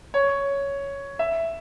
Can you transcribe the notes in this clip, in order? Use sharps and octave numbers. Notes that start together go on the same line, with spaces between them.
C#5
E5